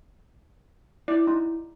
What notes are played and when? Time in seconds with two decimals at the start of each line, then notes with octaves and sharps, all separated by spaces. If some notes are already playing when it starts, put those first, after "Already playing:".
1.08 E4 D5
1.27 D#4